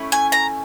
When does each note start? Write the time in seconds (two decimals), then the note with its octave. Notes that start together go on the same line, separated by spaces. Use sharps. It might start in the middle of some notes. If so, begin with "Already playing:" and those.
Already playing: A3 C#4 E4
0.12 G#5
0.32 A#5